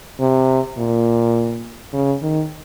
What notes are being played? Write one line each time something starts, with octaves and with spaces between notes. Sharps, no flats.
C3
A#2
C#3
D#3